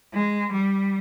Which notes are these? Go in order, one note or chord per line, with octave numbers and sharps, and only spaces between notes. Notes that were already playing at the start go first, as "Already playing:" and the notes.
G#3
G3